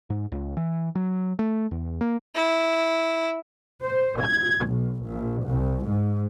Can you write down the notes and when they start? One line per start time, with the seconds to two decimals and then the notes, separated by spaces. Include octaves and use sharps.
0.10 G#2
0.32 C#2
0.57 E3
0.95 F#3
1.39 A3
1.71 E2
2.01 A#3
2.35 E4
3.84 C5
4.22 G#6
4.66 B1
5.05 A#1
5.48 C2
5.88 G#2